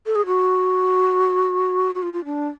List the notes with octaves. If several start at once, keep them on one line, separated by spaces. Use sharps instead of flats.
A4
G#4
F#4
F#4
F4
F4
D4